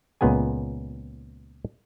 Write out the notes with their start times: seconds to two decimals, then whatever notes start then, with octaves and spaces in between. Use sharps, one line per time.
0.21 C#2 A#2 B3 G#4 G#5